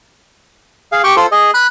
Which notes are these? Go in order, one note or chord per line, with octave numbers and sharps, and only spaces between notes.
G#4 F5
G4 G5 C#6
F4 A4 C5
G#4 D#5
B5 F#6